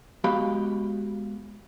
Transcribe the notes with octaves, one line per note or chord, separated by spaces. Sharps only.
G#3 B3 F#4 G4 F5 B5